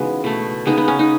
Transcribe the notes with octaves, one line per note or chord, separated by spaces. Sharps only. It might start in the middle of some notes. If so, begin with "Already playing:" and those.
Already playing: C#3 E3 G#3 B3 D#4 F#4
B2 A3
C#3 G#3 B3 D#4
B3
C#4
D#4